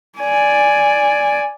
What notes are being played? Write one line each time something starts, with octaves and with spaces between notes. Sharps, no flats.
D5 G#5